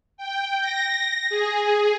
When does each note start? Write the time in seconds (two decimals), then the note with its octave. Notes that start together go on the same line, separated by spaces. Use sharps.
0.17 G5
0.60 A#6
1.30 G#4